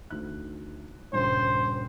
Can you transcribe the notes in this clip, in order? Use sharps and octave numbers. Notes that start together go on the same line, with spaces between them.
D2 D#4 F#6
D#1 G2 C#3 C5